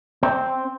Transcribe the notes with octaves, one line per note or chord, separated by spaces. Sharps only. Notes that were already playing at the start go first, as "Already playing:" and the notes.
C4